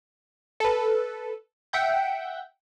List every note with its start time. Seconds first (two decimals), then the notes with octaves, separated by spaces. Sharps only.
0.60 A4 B4
1.73 E5 F#5 G5 G6